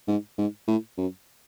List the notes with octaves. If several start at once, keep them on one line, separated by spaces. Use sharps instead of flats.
G#2
G#2
A2
F#2